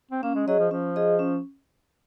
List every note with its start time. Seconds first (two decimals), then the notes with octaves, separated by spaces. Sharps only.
0.11 C4
0.23 A#3 C#4
0.35 G#3
0.47 F#3 G#4 D#5
0.59 F3
0.71 F3 C#4
0.96 G#4 D#5
1.19 C#4